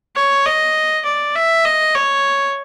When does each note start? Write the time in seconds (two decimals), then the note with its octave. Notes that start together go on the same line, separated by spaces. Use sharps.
0.16 C#5
0.46 D#5
1.05 D5
1.35 E5
1.65 D#5
1.95 C#5